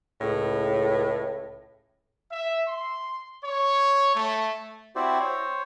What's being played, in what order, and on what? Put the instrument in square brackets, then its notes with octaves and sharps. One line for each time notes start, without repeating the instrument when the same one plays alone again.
[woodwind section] C#2 A2
[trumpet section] E5
C6
C#5
A3
[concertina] C4 E4 F#4 G4 C5 D5
C5 C#5